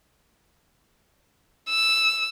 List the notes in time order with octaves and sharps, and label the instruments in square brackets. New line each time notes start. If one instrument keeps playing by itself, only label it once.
[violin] E6